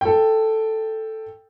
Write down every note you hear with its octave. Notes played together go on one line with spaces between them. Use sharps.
A4 G5